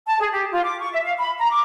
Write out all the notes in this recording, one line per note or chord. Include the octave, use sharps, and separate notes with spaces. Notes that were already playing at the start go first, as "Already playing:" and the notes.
A5
G#4
G4
F4
D6
C#6
E5
F5
B5
A#5
D6